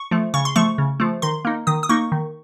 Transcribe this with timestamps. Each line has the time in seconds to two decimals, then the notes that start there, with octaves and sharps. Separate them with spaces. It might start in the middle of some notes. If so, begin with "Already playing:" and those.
Already playing: C#6
0.11 F3 A3
0.34 C#3 C#6
0.45 C6
0.56 F3 A3 C#6
0.78 C#3
1.00 F3 A3
1.22 D#3 C6
1.45 A#3 D#4
1.67 D#3 D#6
1.83 D#6
1.89 A#3 D#4 C#6
2.12 D#3